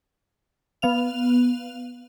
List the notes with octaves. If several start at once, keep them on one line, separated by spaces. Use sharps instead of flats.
B3 F5 F7